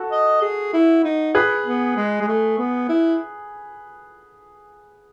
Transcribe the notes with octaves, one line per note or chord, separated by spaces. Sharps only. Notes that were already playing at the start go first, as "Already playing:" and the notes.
Already playing: F#4 A4
D#5
G#4
E4
D#4
G#4 B4
B3
G#3
G#3
A3
B3
E4